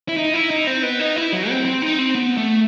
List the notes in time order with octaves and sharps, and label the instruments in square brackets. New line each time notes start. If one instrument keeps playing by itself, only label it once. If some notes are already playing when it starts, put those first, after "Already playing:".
[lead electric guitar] E4
D#4
E4
D#4
C4
B3
D#4
E4
F#3
C4
C4
D#4
C4
B3
A3